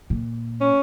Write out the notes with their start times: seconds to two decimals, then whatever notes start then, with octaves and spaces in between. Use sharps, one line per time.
0.10 A#2
0.61 C#4